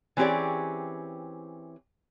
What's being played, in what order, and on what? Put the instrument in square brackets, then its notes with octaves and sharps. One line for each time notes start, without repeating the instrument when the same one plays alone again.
[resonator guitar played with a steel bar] E3 C4 C#4 G4 G#4 D5